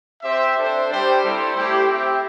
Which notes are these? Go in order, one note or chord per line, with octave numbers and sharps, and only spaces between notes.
C4 G4 C5 E5
D4 A4 C5
G3 D4 G4 C5 G5
G3 C4 E4 A4 C5
A3 E4 G4 C5
C4 G4 E5